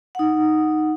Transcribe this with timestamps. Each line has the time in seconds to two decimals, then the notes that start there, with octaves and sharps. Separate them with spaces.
0.15 D#4 F#5